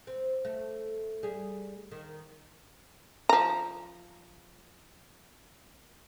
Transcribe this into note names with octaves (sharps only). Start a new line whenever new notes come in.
C4
A3
G3 G#4
D#3
F3 A#5